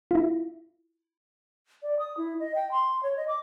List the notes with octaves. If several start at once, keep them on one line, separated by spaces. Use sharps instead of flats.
E4 F4
D5
D#6
E4
D#5
G5
C6
C#5
D#5
D6